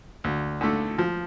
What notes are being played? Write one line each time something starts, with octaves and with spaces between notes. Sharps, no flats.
D2
D3 A3
F3